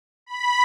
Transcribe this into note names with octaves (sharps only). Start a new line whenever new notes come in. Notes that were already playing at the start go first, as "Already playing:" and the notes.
B5